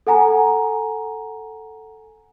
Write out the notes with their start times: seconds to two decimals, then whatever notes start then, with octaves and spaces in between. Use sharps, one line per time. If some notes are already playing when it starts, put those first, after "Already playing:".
0.07 A4 F#5 G#5 A#5